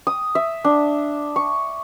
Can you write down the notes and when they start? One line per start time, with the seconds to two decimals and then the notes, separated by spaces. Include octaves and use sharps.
0.07 D#6
0.35 E5
0.65 D4
1.36 C#6